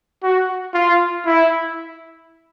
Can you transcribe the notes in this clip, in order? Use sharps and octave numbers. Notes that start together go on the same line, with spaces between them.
F#4
F4
E4